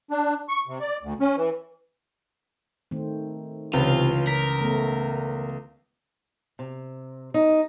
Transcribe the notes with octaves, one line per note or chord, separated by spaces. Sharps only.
D4
C#6
C3
D5
D2
C#4
E3
D#3 A3 C4
C#2 C3 E3 C4 C#4 F4 B4
A#4 B6
A3 B3
C3
D#4